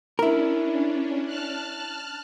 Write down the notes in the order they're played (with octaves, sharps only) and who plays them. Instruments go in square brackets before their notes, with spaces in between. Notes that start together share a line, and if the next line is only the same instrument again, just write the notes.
[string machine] C#4 D4 [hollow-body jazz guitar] E4 A#4
[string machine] A5 F6 F#6